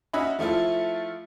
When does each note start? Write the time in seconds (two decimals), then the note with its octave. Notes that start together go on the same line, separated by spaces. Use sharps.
0.13 C#4 F#4 D#5 E5 B5
0.39 F3 A3 E4 F4 A4